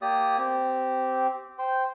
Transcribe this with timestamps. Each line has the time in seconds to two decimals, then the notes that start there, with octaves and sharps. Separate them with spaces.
0.02 A#3 G4 D5 D#6
0.38 C4 G4
1.59 C5 G5